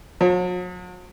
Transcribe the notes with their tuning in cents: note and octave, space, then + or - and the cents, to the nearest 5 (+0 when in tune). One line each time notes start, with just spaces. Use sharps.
F#3 -45